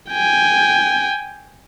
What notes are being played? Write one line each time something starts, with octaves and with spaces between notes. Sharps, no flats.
G5 G#5